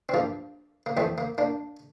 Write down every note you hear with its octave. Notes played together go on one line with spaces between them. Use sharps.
C4
G2 F3 A#3
A#3
F2 E3 A3 C4
A#3
A#3 D4